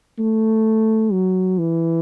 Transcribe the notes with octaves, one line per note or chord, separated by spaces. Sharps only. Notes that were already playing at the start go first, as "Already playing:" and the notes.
A3
F#3
E3